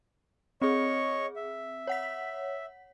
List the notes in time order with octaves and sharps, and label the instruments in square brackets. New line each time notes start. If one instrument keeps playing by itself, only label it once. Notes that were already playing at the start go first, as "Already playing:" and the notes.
[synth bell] C4 G#4 [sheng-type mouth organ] C#5 D#5 C#6
[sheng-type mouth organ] E5
[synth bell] C#5 F#5 B6